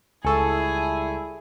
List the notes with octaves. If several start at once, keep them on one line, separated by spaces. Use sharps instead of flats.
C#2 G3 E4 G#4 A4 G#5 C#6 E6